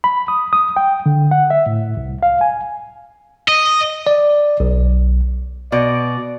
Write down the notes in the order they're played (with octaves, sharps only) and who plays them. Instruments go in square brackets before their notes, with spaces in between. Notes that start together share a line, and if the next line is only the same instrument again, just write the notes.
[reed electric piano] B5
D#6
D#6
G5
D3
F#5
E5
A2
C2
F5
G#5
[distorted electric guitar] D#5
[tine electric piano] D5
B1
[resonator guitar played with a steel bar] B2 [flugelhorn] D5